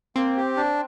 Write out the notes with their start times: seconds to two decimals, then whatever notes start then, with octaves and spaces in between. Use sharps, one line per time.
0.16 A#3 C4
0.37 G4
0.57 D4